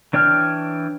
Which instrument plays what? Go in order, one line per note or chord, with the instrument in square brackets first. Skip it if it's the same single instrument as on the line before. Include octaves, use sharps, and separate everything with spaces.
[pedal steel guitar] E3 D4 C#5 G5 F6